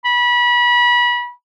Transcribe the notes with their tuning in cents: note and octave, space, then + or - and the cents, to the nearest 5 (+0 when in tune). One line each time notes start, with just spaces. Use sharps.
B5 -30